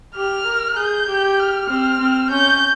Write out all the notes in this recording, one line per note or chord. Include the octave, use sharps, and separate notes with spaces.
G4 F6
A#4
G#4 G6
G4
F6
C4
C4
C#4 G6